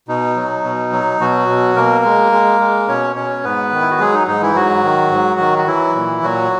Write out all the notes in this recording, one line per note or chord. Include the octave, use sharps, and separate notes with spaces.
B2 D#4
F#3
B2
F#3
B2 F#3 F#4
B2
B2 A#3 A#4
G#3
G#3
G#3
B2 C#4 C#5
B2 C#4 C#5
G#2 B3 B4
D#3
E4
F#4
F#3 G#3 G#4
D#4
G#2 D#4
E3 E4
G#2 F#3 F#4
D#3
G#2
D#3
F#4
E3 F#3 E4
A#2
A#2 F#3 F#4